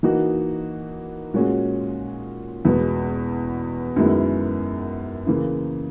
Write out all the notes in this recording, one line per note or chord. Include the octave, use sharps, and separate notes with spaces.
E3 A#3 D#4 F#4
A#2 G#3 C#4 F#4
E2 B2 G#3 B3
F#2 D#3 G#3 B3 E4
C#3 E3 A#3